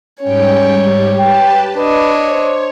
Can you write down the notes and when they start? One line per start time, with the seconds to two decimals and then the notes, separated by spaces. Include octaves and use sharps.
0.23 G#2 G3 C#4 C#5 G5
0.80 G#2 G3 G4
1.19 G4 B4 G5 A5
1.76 D4 B4 C#5 D#5
2.31 C5